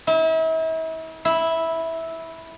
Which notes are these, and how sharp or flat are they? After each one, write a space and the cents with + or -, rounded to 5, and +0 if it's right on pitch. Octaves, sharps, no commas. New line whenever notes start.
E4 -40
E4 -10